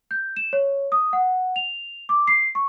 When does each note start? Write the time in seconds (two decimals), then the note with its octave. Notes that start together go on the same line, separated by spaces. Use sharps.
0.11 G6
0.36 E7
0.53 C#5
0.92 D#6
1.13 F#5
1.56 F7
2.09 D6
2.27 C7
2.55 C#6